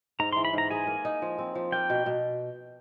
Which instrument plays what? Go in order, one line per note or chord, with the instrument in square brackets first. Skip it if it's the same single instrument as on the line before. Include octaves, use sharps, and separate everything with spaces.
[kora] G#2 [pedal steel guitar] A#5
[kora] E3 [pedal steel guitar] C6
[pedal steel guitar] B5
[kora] G#2 [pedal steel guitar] A#5
[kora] G#4 [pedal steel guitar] G#5
[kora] A#3
D#4
F3
C4
F3
[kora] A#3 [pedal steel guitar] G5
[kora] B2
B2